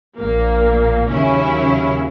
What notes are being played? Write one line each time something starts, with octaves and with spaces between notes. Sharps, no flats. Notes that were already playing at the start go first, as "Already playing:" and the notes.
A#1 A#2 A#3
D#2 C#3 F#3 C#4 E4